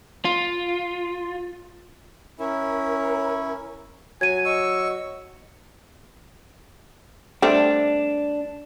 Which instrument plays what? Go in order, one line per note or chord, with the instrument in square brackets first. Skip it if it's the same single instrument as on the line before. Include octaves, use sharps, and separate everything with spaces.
[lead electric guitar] F4
[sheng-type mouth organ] C#4 E4 [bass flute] A#4
[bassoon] F#3 [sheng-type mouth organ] G#5 [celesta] G#6 D#7
[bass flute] D#5 [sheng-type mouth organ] C#6 E6
[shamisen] G3 A3 C4 [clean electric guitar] D4